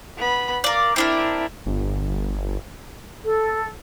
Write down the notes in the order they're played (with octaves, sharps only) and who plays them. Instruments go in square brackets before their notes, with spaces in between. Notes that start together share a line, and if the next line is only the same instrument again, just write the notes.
[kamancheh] B3 B5
[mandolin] A#4 D5 [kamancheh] F5
[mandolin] C4 D4 A#4 [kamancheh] E4 E5
[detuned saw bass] G1
[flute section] A4